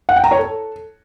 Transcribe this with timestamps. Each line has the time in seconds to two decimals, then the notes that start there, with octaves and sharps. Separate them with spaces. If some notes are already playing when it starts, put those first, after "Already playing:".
0.09 F#5
0.16 G5
0.24 A#5
0.31 C#5
0.39 A4